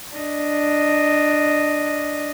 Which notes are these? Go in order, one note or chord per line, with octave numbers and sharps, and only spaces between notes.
D4 D#5